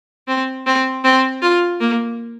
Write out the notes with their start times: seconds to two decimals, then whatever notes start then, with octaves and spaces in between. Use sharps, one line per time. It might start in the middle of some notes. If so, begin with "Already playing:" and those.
0.28 C4
0.66 C4
1.04 C4
1.42 F4
1.80 A#3